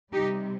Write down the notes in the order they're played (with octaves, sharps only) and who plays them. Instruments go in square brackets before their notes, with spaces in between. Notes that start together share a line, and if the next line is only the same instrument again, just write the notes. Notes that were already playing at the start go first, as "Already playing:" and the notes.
[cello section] C3 G3 D#4 G4